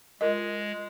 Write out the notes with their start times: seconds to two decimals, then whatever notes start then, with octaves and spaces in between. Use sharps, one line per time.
0.21 G#3 F4 A#4 D#5